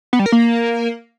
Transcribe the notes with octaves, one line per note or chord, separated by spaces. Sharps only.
B3
G3
A#4
A#3